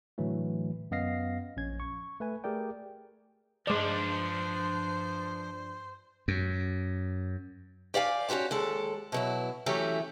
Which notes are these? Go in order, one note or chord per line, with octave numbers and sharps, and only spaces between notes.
A2 D3 E3 F#3 A3
F#2 B3 D#5 F5 A#6 C7
A#1 C#4 G#6
C#6
A3 B4 G#5
A3 G4 G#4 A#4 D5 G5
G2 F3 G#3 D4 C5 D5
F#2
G4 D5 F5 G5 G#5
C#4 D#4 F#4 G4 C5
D#2 G#3 A4
B2 F#3 E4
E3 F#3 A3 C#4 G4